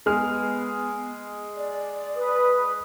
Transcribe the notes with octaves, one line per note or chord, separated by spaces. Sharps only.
G#3 B3 G#4 F6
D5
B4 D#6